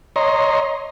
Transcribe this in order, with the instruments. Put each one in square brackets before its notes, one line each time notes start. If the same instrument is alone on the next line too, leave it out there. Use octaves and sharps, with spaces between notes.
[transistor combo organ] C#5 D#5 A#5 C6